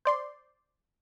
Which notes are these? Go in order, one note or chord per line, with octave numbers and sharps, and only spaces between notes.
C5 D5 C6